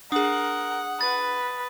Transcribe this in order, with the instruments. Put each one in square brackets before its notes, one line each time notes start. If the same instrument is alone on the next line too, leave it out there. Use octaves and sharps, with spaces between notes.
[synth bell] D4 G#4 [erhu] A#4 [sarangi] F#5 [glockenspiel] D#6
[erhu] B4 [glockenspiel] A6